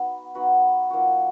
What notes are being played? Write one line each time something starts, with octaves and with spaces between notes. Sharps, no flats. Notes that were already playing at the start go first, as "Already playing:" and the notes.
Already playing: B3 D#4 F#4 B4
B3 D#4 F#4 B4
F3 A#3 D#4 F#4